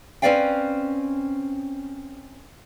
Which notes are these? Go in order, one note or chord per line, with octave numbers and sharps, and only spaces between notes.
C4 C#4 B4 D5 F5 G5